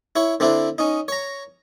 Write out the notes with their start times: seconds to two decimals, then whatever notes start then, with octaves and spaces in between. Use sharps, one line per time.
0.16 E4 C#5
0.40 D3 C4 D4 E4
0.78 C#4 D#4
1.08 C#5 A#5